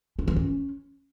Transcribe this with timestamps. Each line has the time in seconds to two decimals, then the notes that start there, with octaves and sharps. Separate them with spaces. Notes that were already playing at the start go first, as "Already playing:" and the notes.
0.19 D4
0.28 E3
0.36 C#4